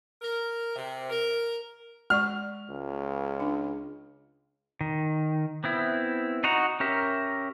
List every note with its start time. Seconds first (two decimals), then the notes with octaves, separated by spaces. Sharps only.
0.22 A#4
0.76 C3
1.10 A#4
2.10 G#3 D5 C#6 F6
2.69 C#2
3.40 D4
4.81 D#3
5.64 B3 C4 E4
6.44 D#4 F#4 F#5 A#5
6.80 C#4 G4 A#4 E5